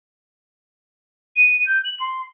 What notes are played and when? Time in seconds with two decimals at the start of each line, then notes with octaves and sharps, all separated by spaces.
1.36 D#7
1.66 G6
1.84 F#7
2.00 C6